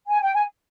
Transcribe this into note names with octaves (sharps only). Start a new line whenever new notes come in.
G#5
G5
G#5